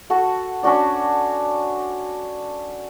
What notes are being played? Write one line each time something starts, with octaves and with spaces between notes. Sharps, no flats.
F#4 A4 F#5
C#4 D4 F#4 D5